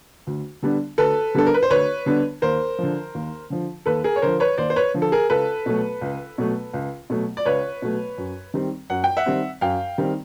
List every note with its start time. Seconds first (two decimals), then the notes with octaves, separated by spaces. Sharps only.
0.27 D2
0.63 D3 G3 B3 D4
0.98 D2 A4 B4
1.35 D3 G3 B3 D4 A4
1.46 A#4
1.54 B4
1.63 C5
1.70 D2 B4 C#5
2.06 D3 G3 B3 D4
2.42 D#2 A#4 C5
2.79 D3 F3
3.15 D#2
3.50 D3 F3
3.86 D#2 A4 B4
4.04 G#4 A#4
4.16 C#5
4.22 D3 F3 A#4 C5
4.40 B4 C#5
4.58 D#2 C5 D5
4.70 C5
4.76 B4 C#5
4.94 D3 F3
5.02 A4
5.12 G#4 A#4
5.30 C#2 A4 B4
5.66 B2 F#3 A3
6.01 C#2
6.38 B2 F#3 A3
6.73 C#2
7.10 B2 F#3 A3
7.37 D5
7.45 C#2 B4 C#5
7.82 B2 F#3 A3
8.18 F#2
8.54 D#3 G3 C4
8.90 F#2 F#5
9.04 G5
9.17 E5 F#5
9.26 D#3 G3 C4
9.61 F#2 F5 G5
9.98 D#3 G3 C4